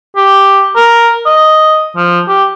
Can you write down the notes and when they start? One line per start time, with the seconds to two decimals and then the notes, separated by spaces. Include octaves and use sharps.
0.17 G4
0.76 A#4
1.26 D#5
1.96 F3
2.28 G4